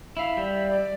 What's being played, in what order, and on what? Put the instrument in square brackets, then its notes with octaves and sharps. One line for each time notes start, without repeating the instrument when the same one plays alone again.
[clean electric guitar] E4 F5 [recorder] E5
[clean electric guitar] G3
[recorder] D5